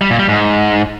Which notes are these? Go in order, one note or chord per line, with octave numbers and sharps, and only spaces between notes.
G3
A#2
G3
G#2